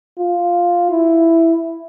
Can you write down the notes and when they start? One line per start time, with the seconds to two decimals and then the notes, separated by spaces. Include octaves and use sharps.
0.19 F4
0.90 E4